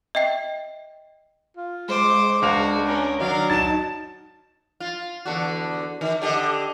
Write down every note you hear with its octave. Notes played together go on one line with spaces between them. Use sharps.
D#5 E5 G5 C7
F4
G#3 C5 D6
C#2 D4 F#4 F5 F7
C#4 A#4
D#3 F#3 D4 A#4 F5
D#4 A5 A6 E7
F4
E2 D3 F#4
D#3
D3 G4 D#5